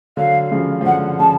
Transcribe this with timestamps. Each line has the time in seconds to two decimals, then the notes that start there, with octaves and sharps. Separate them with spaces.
0.17 D3 F#3 F5
0.52 C#3 F3
0.81 F3
0.86 D3 F#5
1.20 C#3 A5